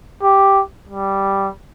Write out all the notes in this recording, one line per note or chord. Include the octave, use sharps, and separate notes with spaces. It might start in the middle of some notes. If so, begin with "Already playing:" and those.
G4
G3